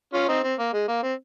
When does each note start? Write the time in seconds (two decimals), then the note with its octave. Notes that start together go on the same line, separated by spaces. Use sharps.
0.14 C#4 F4
0.29 C4 D#4
0.44 C4
0.59 A#3
0.74 G#3
0.88 A#3
1.03 C4